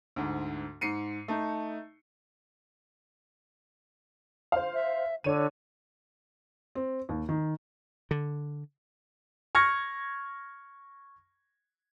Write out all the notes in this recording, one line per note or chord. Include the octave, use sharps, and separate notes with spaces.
D2 G#2
G#2 C7 C#7 D#7
A3 D#4
C5 F5
E5
D3 C#5 D#7
C4
D#2
D#3
D3
C#6 F6 G#6 A#6 C#7